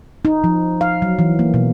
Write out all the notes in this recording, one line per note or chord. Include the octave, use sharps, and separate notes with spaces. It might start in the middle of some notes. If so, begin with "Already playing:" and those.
D#4
F3
F5
F#3
E3
A#3
B2